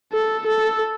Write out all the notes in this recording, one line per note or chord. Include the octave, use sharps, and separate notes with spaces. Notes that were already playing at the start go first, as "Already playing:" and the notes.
A4
A4